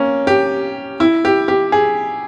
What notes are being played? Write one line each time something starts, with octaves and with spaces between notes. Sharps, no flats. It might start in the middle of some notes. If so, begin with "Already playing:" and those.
Already playing: A#3 C#4
G4
E4
G4
G4
G#4